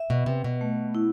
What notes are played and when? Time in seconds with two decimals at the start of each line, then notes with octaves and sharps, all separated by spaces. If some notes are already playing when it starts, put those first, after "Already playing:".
Already playing: E5
0.10 B2
0.26 C3 B4
0.44 B2
0.61 A3
0.95 E4